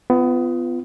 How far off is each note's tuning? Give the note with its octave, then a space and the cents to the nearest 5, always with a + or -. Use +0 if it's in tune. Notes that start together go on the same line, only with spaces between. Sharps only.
B3 +25 F4 -20